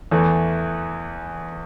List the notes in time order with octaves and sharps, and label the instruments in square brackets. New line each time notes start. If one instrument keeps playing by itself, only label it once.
[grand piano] E2 E3 A3